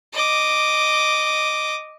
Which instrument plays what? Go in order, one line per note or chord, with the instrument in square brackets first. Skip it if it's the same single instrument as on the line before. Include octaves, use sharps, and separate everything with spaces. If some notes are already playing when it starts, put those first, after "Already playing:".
[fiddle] D#5 D6